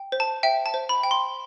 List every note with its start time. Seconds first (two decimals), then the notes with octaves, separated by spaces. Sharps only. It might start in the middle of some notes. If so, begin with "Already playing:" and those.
Already playing: G5
0.12 C5
0.20 A5
0.43 E5 G5
0.66 A5
0.74 C5
0.89 B5
1.03 G5
1.11 C6